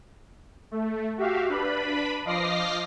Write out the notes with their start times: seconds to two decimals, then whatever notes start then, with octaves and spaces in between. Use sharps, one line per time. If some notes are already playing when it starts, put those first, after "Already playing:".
0.71 A3
1.18 F#4 G4 E5 F5
1.49 D4 B4 B5
2.25 F3 D#5 F5 D6 A#6 C7